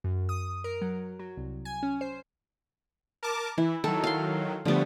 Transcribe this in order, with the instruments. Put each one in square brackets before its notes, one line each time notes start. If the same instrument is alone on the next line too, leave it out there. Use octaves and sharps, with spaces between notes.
[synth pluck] F#2
D#6
A#4
F#3
F#3
C2
G#5
C#4
C5
[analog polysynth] A#4 A5 D6
[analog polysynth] E3 [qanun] E4
[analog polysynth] D#3 F#3 [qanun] A4
[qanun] F5 C6
[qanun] D3 G3 [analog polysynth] F3 A3 B3